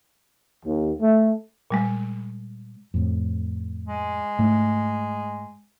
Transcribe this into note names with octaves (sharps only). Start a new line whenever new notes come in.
D#2
A3
A#2 G3 G#3
F2 A2
G#3
G#2 A3